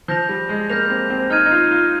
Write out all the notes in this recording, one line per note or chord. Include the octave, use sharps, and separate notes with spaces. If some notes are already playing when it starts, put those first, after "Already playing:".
F3 G6 A#6 F7
G3
G#3
A#3 G6 A#6 F7
C4
C4
D#4 F6 G#6 D#7
D#4
F4
F4